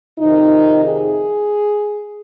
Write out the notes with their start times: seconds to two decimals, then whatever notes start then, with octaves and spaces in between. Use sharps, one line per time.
0.19 F2 C3 D#3 D#4
0.85 G#4